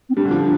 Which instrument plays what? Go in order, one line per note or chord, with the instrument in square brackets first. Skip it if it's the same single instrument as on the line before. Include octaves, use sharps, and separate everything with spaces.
[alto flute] C4
[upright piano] G3 [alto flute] D4
[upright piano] D3
F3